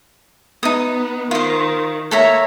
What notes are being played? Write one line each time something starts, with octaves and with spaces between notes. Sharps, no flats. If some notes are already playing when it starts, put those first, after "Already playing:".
B3 D#4 D#6
D#3 F4 C5
A#3 A4 C#5 E5 A#5